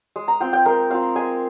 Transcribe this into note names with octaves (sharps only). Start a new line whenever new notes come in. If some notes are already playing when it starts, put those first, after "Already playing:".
G#3
A#5
C4 F4 G5
G5
G#3 A#4
C4 F4 F5
G#3 G#5